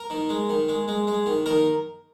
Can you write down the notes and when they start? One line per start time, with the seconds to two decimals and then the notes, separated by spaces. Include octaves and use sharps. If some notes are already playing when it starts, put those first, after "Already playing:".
Already playing: A#4
0.10 D#3
0.29 G#3
0.49 D#3
0.69 G#3
0.88 G#3
1.07 G#3
1.26 D#3
1.46 D#3 A#4